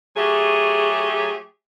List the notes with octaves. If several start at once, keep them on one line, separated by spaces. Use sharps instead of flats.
F#3 A3 G4 G#4